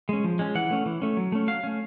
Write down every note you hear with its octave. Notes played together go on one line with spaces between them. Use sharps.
G#3 C#4
F3
G#3 C#4
E3 F#5
A3 C#4
E3
A3 C#4
F#3
A3 C#4
F#3 F5
A3 C#4